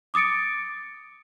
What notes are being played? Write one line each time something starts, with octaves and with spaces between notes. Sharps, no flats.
D6 D#6 A6 C#7 D7